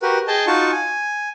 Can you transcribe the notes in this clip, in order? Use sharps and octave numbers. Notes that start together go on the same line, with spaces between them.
F#4 G4 A#4 B4
G#4 D#5 G5 A5
D#4 F4 F#4 A5 C#6
G#5